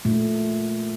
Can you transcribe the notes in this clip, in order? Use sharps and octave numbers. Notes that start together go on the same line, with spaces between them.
A#2 A3